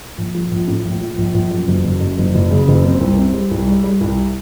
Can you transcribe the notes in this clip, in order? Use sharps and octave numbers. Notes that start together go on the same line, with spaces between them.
A#1
F3
A#1
A2
A#1
F3
A#1
A#1
F#2
F#1
F#1
F#2
F#1
F#1
C#3
F#1
C4
C2
C4
G3
C2
G3
G3
C2